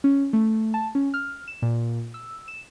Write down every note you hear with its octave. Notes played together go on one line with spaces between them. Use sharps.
C#4
A3
A5
C#4
F6
E7
A#2
E6
E7